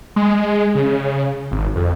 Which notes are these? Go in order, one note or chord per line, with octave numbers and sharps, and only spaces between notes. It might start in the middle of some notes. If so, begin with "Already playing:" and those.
G#3
C#3
G#1
F2